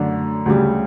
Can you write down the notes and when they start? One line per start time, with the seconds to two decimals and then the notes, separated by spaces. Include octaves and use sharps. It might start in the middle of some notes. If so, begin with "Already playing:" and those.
Already playing: F#2 D3 A3 D4
0.46 D2 C#3 G3